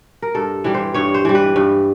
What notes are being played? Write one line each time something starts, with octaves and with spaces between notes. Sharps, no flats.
A#4
G2 A4
E3 G3
C5
G2 C#5
C5
E3 G3
B4
G2